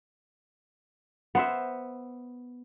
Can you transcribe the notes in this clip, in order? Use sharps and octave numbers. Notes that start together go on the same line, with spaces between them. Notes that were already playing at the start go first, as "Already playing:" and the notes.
B3 C5 E5